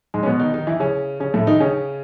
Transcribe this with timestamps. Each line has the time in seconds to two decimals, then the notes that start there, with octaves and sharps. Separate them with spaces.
0.14 G#2 G#3
0.23 C#4
0.26 B2 B3
0.40 D#3 D#4
0.54 D#3 D#4
0.67 E3 E4
0.80 C#3 C#4
1.20 C#3 C#4
1.34 A2 A3
1.47 D#3 D#4
1.60 C#3 C#4